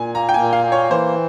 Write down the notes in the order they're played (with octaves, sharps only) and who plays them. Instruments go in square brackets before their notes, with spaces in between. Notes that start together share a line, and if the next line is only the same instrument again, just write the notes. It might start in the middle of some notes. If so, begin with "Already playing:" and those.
Already playing: [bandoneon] A#2 [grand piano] G#5
[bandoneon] A#3 [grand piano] A#5
[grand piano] G5
G#5
[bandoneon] A#2
[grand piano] F5
[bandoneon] A#3
[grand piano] C#5
[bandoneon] E3 [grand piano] C5